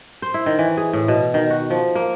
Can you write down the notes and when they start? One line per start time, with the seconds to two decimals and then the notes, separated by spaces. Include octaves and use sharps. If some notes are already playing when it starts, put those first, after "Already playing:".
0.22 C5
0.34 E4
0.46 D#3
0.59 E3
0.77 G#4
0.93 A2
1.08 B2
1.34 D#3
1.50 F#4
1.70 F3
1.95 A#3